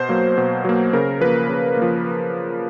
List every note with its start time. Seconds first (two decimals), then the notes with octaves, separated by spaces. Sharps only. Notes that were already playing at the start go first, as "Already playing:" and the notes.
Already playing: B2 C5
0.09 F#3 A#3
0.38 B2
0.65 F#3 A#3
0.93 C#3 A#4
1.21 F3 A#3 B4
1.49 C#3
1.77 F3 A#3